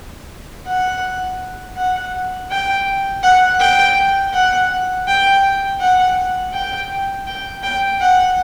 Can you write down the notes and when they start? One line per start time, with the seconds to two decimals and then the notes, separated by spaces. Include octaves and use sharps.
0.67 F#5
1.76 F#5
2.50 G5
3.23 F#5
3.60 G5
4.33 F#5
5.08 G5
5.80 F#5
6.54 G5
7.27 G5
7.63 G5
8.01 F#5